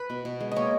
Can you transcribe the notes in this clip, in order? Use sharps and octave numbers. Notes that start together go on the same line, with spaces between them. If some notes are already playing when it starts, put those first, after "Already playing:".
Already playing: B4
B2
B2
G#3
A#3 C#5 D#5